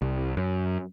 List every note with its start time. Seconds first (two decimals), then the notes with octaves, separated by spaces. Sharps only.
0.02 C2
0.37 F#2